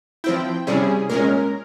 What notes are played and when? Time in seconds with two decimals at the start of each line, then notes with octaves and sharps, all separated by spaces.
0.24 F3 C4 E4 G5
0.67 C3 G3 C#4 E4 G#4
1.09 A#2 G#3 C#4 A#4